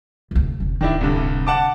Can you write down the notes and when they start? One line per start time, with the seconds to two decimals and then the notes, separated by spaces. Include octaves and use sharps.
0.31 F1 D2
0.60 F1 C#4
0.81 D1 D#3 D4 E4
1.01 C2 G2 D3
1.47 F#5 A5 D6